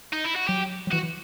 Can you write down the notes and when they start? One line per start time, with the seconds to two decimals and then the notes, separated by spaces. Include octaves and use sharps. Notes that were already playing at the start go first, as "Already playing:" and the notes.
0.13 D#4
0.25 E4
0.36 F#4
0.48 F#3 G4
0.87 F#3
0.92 E3 F#4
1.03 E3